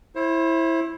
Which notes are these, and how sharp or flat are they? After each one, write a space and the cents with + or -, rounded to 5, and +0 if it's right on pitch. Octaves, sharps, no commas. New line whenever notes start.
E4 +0 C5 +35